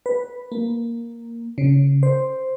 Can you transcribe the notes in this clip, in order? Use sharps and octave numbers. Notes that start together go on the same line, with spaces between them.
B4
A#3
C#3
C5